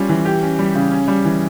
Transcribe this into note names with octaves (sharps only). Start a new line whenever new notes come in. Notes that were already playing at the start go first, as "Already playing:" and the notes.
Already playing: G3 C#4 F4
E3
G4
C#4
G3
C#3
C#4
G3
E3